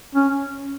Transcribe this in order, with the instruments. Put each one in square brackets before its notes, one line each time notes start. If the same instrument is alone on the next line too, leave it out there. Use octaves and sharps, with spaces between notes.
[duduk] C#4